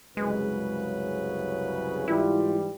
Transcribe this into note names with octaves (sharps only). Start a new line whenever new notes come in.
C2 F#2 C#3 G#3 B4
G#2 E3 G3 E4 F4